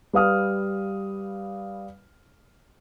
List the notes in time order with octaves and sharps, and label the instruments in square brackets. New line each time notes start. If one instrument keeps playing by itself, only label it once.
[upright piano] G3 B4 F5 D#6 F6